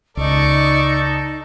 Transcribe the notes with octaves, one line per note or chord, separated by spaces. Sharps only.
C#2 D#4 A4 D5 C#6